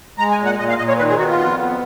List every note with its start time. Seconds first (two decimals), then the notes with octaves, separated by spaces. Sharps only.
0.18 G#3 A#5
0.31 G#5
0.38 A#2
0.46 F#5
0.59 A#2 D#5
0.69 F5
0.78 A#2 D#5
0.88 C#5
0.98 D#3 B4
1.09 G#4
1.18 B3 F#4
1.28 F4
1.39 F2
1.58 B3